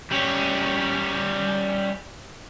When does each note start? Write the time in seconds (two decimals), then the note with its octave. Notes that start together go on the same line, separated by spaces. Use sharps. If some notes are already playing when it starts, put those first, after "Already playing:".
0.11 G3 C#4